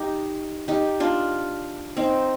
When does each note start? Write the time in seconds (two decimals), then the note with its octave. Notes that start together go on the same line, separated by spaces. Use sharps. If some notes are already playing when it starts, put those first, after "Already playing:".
Already playing: D#4 G4
0.68 D#4 G4
1.00 D4 F4
1.97 C4 D#4